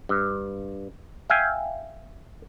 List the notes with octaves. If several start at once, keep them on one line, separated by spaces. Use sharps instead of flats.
G2
E5 F5 G5 G#5